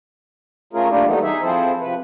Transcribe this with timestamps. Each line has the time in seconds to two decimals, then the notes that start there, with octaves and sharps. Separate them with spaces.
0.73 A3 C#4 F4 G#4 A#4
0.90 A3 A#3 D4 E4 F4 G4
1.06 E3 G3 A3 B3 D#4
1.22 D#4 G#4 E5
1.42 F3 C4 E4 G#4 A4 C5
1.81 C3 F3 B4